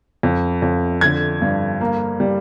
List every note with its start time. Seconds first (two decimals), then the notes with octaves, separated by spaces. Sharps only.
0.23 F2
0.62 F2
1.01 D3 G#6
1.42 G2
1.81 A#3
2.20 G3